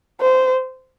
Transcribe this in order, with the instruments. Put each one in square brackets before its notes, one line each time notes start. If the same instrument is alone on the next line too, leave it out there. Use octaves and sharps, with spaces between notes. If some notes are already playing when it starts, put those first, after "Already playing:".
[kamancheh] C5